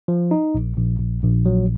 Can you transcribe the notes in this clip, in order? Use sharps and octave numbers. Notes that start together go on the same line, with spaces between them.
F3
D#4
A#1
A#1
A#1
A#1
F#3